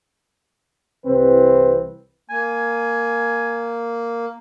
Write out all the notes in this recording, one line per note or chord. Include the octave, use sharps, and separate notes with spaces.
C2 C3 E3 C4 B4
A#3 G#5